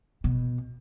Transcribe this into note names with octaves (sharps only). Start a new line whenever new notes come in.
B2